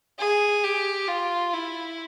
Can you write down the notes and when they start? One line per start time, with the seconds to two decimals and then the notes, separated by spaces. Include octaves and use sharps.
0.19 G#4
0.64 G4
1.08 F4
1.53 E4